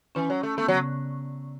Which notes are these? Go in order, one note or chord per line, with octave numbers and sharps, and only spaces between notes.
E3 C#4
F#3
A3
A3 B3
C#3 F#3